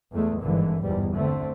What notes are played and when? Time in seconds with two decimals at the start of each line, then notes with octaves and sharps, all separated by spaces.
0.12 E2 G#3 A3
0.42 G#1 G2 D3 E3
0.84 G1 E2 G#2 G3
1.15 D3 A3 C4